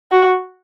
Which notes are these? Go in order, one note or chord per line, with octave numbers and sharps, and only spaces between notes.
F#4